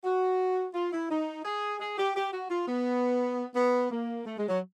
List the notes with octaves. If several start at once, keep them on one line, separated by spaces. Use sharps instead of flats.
F#4
F4
E4
D#4
G#4
G#4
G4
G4
F#4
F4
B3
B3
A#3
A3
G#3
F#3